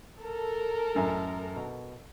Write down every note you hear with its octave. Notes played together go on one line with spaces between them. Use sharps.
A4 A#4
A1 F#2 G#5
B2